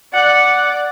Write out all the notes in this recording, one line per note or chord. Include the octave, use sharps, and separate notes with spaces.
D5 F#5